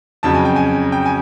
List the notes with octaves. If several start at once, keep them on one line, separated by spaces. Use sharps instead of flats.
F2 C#3 F#3 A5
G#5
G5
G#5
G5
G#5